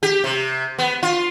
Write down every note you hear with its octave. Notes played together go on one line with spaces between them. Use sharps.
G4
C3
B3
F4